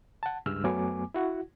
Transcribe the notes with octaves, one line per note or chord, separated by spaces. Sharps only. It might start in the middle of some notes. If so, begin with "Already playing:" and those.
F#5 A5
C#2 G2 G#3 E6 F6
F#2 F#3 A3 B3 G#5 D6
E4 F#4 F#5